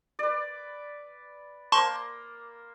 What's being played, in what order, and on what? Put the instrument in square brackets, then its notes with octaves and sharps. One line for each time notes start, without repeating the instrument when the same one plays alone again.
[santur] B4 D5
[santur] A#3 A#4 C5 [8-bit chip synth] A5 C6 C#6